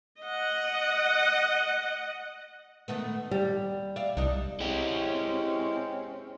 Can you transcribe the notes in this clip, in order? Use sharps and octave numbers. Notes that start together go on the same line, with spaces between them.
D#5 F#5
D#3 A3 B3
D#2 G3
D5 E5 F5
C2 D4 D#4
G#3 C4 C#4 E4 G4